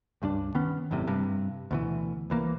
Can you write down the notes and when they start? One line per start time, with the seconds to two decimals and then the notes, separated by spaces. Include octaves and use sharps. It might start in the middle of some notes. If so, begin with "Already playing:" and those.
0.22 C#2 G2 C#4 D4
0.55 D#3 B3 C#4
0.91 G#1 F#2 A2 C3
1.07 G2 C3
1.71 D2 B2 E3
2.30 C2 E3 A#3